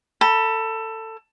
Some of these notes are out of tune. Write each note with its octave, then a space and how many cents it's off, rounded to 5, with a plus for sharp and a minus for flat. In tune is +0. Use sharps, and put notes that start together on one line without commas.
A4 +20 B5 -20